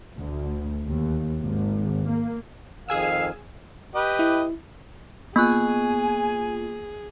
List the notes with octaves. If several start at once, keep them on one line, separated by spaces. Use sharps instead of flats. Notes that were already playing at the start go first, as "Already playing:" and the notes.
D2
D#2
G#1
A#3
F2 D#3 G#4 F5 G#5 E6
G4 B4 D#5
E4
A#3 B3 F4 G#4 G#5 C#6 F#6